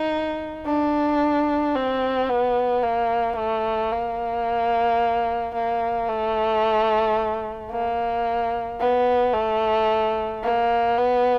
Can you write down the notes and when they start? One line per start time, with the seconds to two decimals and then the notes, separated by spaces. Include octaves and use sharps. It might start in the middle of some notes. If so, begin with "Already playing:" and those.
Already playing: D#4
0.66 D4
1.76 C4
2.29 B3
2.83 A#3
3.38 A3
3.92 A#3
5.54 A#3
6.09 A3
7.71 A#3
8.80 B3
9.34 A3
10.43 A#3
10.98 B3